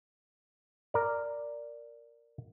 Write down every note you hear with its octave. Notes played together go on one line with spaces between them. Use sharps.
A#4 D5